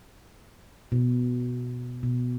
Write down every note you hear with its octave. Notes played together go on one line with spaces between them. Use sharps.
B2
B2